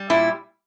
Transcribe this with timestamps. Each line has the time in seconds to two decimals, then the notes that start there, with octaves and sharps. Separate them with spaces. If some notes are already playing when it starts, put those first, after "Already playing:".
Already playing: G3
0.10 A#2 E4